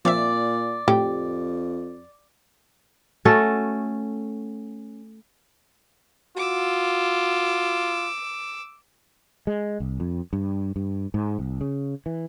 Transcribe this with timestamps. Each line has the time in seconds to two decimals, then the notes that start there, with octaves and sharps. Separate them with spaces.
0.05 A#2 F3 C4 D5 E5
0.88 F2 A2 G4
3.25 A3 C#4 F#4 A4
6.37 F4 F#4 D6 E6
9.47 G#3
9.80 C2
10.00 F2
10.33 G2
10.76 G2
11.14 G#2
11.39 C2
11.61 C#3
12.06 E3